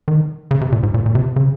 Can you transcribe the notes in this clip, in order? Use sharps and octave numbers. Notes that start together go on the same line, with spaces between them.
D#3
C#3
C3
A#2
G#2
A#2
A#2
C3
C#3